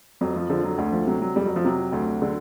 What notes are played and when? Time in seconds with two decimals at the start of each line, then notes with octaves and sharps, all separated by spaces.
0.21 F2 F#3
0.36 F3
0.50 D3 F3
0.64 F#3
0.78 D2
0.92 F3
1.07 C3 F#3
1.22 F#3
1.36 F2 G3
1.46 F#3
1.56 F3
1.64 C3 F#3
1.93 D2
2.22 D3